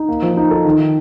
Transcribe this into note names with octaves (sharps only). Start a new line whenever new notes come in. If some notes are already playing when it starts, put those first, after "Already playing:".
Already playing: D#4
A#3
F3
D#4
A4
D#3